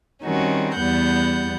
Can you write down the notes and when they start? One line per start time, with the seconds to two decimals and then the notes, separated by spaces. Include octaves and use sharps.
0.23 D#3 G3 C4 C#4 F#4
0.76 E2 G3 B3 F#5 G6